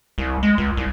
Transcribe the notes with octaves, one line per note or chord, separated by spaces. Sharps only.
C2
G#3
C#2
C2